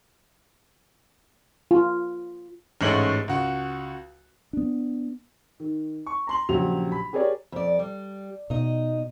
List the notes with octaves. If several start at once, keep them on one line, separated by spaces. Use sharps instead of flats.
F4
A1 G#2 G#3 A3 C#4 F#7
C#2 F#4
B3 D4
D#3
C#6
A#5 C6 F#7
A#1 C#3 F#3 F#4 G4 F7
B5
G4 G#4 A#4 C#5 D5
F2 D5
G3
B2 D#4 D#5